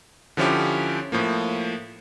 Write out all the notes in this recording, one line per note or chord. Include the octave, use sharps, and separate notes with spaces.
D3 F3 C#4 E4 G4
A2 F3 A#3